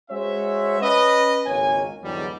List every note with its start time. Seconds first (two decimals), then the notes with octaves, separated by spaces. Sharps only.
0.11 G#3 C#4 F#4 C5 C#5 E5
0.81 C#4 B4 D#5
1.46 G#1 C#2 A#3 C#5 G#5
2.03 E2 G#2 D3 E3 F#3 G3